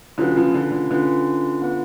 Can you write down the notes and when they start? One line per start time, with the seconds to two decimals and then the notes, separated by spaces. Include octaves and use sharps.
0.18 D3 F#3 C#4 F4 B4
0.36 C#3 F3
0.54 D3
0.72 D3
0.91 D3 C#4 F4 B4
1.62 B3 F4 B4